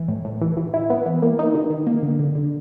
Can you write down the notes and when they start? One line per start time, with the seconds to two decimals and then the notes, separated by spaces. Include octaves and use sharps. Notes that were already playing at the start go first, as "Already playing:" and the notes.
Already playing: E3
0.08 A2
0.25 A2
0.41 E3
0.57 E3
0.74 E4
0.90 B3
1.06 E3
1.22 A#3
1.39 D#4
1.55 D#3
1.70 D#3
1.87 A#3
2.03 D3
2.19 D3
2.35 D3